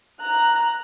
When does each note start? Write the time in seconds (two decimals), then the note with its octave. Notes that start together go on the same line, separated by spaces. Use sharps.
0.20 A#5 F#6